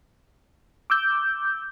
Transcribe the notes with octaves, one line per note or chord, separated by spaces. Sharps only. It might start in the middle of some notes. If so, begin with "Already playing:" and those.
D6 E6 G6